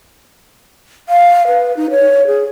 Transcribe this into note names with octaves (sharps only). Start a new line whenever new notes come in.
F5
B4
D#4
C#5
G#4